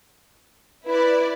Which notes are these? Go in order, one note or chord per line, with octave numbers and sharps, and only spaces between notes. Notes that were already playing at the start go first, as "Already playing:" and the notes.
E4 B4 D5